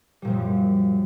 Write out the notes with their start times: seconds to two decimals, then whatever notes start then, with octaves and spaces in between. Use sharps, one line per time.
0.22 G3
0.25 A#2
0.27 F3
0.30 F#2